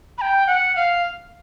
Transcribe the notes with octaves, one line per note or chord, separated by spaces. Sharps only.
B5
G5
F#5
F5